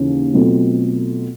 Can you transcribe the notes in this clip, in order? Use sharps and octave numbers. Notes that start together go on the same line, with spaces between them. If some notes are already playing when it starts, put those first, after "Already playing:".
Already playing: D#2 C#3 E3
B2 F#3 A3 C4 F4